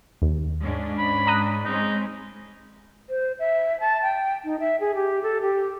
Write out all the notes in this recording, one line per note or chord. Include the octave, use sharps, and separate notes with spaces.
D#2
G#2 C#4 D4
B5
A#5 D#6 F#6
G#3 C4 C#4 D#4
C5
E5
A5
G5
D#4
E5
G#4
G4
A4
G4